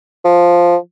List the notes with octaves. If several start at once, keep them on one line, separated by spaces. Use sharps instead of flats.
F3